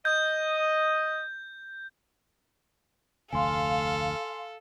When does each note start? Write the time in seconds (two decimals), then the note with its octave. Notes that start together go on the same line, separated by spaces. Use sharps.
0.05 D#5 G6
3.33 F1 D2 A4 F5 G#5 C6